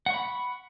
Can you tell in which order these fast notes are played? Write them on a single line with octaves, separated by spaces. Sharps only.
F#5 C#6 B5